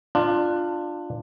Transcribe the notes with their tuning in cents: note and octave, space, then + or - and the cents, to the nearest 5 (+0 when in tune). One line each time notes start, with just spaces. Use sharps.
D4 +20 F4 +0